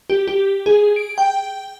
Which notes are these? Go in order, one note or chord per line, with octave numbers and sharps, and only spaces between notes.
G4
G4
G#4
D7
G5